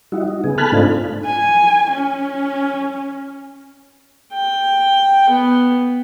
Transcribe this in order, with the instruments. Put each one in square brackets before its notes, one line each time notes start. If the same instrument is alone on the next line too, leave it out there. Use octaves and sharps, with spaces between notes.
[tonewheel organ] G3 D#4 E4 F#4
D#4
C#3 B3 G#4
A4 G#5 A5 B5 F6 F#6
G#2 A3 C4 D4 D#4 F4
[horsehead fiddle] G#5
C#4
[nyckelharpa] G5
B3